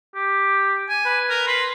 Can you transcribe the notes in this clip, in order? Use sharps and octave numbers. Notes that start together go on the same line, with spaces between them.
G4
G#5
B4
A#4
B4 C6